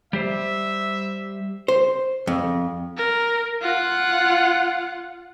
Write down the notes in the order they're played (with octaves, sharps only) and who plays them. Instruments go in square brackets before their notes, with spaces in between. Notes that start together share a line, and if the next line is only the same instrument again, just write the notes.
[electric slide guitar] G3 G4 C5 [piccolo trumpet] E5
[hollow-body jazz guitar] C5
F2
[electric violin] A#4
F4 F#5